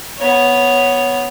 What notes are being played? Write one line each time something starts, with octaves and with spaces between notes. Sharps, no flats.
B3 C#5